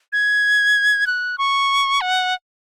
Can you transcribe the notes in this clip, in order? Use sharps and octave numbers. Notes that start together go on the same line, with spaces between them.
G#6
F#6
C#6
F#5